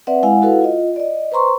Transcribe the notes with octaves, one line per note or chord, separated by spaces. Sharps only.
C4 B4 D5 E5 F#5
G#3 E4 F5 F#5 G#5
E4 F#4 A4 B4 F5 F#5
F4 D#5
D5 D#5
B4 C5 A#5 C6 C#6